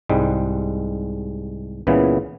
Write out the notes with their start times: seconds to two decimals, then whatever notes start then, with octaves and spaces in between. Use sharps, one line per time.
0.09 C2 G#2 G3 G#3
1.87 C#2 A#2 C#3 E3 B3